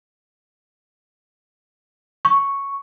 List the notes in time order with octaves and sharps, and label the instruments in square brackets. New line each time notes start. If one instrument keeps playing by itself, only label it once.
[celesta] C#6